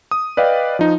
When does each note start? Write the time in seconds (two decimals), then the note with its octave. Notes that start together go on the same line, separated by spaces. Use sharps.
0.11 D#6
0.37 B4 D5 D#5 F5 G5
0.79 F3 D#4